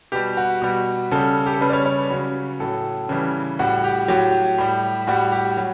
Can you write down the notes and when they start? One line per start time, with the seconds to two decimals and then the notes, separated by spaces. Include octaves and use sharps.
0.12 B2 G3 G4
0.37 F#4
0.62 B2 G3
1.11 C#3 G3 A4
1.46 G4
1.54 A4
1.61 C#3 G3 B4
1.70 D5
1.73 C#5
1.86 C#5
1.98 B4
2.10 C#3 F#3
2.60 A2 F#3 A4
3.09 C#3 E3 G3
3.59 A2 G3 F#4
3.84 G4
4.08 A2 F#3 G4
4.58 A2 G3
5.07 A2 G3 F#4
5.32 G4
5.57 F#3